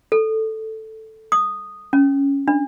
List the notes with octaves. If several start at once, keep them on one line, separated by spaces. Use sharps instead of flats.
A4
D#6
C#4
D4